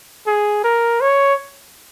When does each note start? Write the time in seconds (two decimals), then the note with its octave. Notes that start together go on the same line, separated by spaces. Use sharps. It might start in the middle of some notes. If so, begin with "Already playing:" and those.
0.27 G#4
0.64 A#4
1.01 C#5